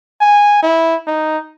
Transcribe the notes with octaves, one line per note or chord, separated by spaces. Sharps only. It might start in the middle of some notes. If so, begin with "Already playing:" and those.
G#5
E4
D#4